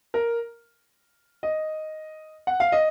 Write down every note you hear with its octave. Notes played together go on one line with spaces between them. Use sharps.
A#4
D#5
F#5
F5
D#5